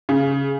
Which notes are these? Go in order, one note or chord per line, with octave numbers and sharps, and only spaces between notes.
C#3